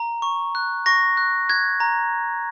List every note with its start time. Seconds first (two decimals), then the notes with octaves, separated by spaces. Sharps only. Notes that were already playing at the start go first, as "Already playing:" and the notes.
Already playing: A#5
0.22 C#6
0.55 F#6
0.86 C#6 A#6
1.17 F#6
1.49 F#6 G#6
1.80 A#5